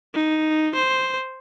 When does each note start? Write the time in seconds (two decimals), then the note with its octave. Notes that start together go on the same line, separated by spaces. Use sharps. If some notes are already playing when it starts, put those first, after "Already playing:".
0.14 D#4
0.75 C5